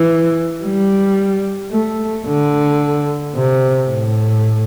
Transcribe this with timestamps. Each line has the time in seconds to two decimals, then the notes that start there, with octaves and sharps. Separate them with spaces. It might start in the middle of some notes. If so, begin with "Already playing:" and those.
Already playing: E3
0.64 G3
1.72 A3
2.26 D3
3.35 C3
3.89 A2